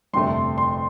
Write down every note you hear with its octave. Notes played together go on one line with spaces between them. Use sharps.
G1 F2 C3 A3 C6
C6